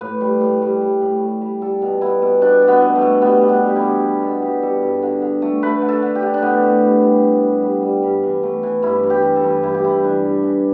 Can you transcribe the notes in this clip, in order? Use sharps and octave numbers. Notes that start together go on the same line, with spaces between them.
A2 B4
G3
A2
G3
G3
A2
G3
G3
G3 A4
B2
B2 E4
B2
B2 D4
B2
B3
B2
A3
B2
G3 B3
G3
D4
G3
G4
E4
B2
B2
B2 A4
G3 G4
G3 A4
G2
D3
D3
A3
A3 B4
D3
A4
D3
G4
D3
D4
A2 B3
A2
G3
G3
A2
G3
G3
G3
G2
E3
A3
E3
G2 E4
G2
G4
E3
A4
G2
G2 E4
G4
E3 E4
G2 D4
G2
E3